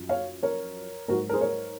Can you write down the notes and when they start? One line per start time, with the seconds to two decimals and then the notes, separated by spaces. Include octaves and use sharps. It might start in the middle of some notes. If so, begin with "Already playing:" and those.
Already playing: F#2 F3
0.09 C#5 F5
0.43 A#4 C#5
1.08 G#2 F#3 F#4 A#4
1.29 A#4
1.33 G#4 C5
1.41 A#4 C#5